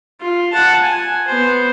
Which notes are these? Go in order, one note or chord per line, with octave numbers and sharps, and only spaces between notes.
F4
F#5 A5
G#5
B3 C5